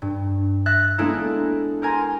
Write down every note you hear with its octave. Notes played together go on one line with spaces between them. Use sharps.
G2
E5 F#6 A6 A#6
G#3 A#3 B3 D4 E4 A4
G4 A#4 G#5 A#5 C6